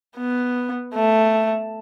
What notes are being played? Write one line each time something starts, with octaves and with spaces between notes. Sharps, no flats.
B3
A3